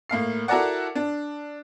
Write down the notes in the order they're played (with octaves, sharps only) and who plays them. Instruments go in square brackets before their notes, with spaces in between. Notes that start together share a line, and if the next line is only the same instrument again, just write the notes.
[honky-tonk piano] A2 A#3 F5 C7
E4 F#4 A4 A#4 D5 F#5
D4